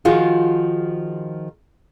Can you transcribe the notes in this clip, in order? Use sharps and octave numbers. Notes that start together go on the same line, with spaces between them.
D#3 F3 F4 F#4 G#4